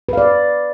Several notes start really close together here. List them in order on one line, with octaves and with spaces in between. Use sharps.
B4 F5 D5